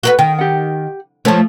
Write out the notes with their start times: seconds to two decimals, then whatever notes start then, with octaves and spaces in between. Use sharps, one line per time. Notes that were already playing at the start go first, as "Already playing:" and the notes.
0.03 F#4 A#4 B4
0.19 D#3 G5
0.39 G4 F#5
1.25 F3 A3 C5 C#5 A5